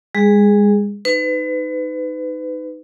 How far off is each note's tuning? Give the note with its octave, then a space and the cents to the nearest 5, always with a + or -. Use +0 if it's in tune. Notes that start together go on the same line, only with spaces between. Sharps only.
G#3 -30 G#4 +0
D#4 +0 B4 +30